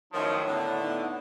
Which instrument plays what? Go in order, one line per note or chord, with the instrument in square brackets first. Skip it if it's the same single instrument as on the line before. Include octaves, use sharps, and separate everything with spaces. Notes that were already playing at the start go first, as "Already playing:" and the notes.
[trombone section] F#2 A2 F3 [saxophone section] D#3 [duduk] D#4 [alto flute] C#5
[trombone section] A2 [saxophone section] D3 [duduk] B3
[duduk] B3 [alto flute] D#4